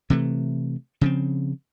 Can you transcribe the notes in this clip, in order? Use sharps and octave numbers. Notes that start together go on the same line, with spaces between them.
C3 E3 A3
C#3 F3 C4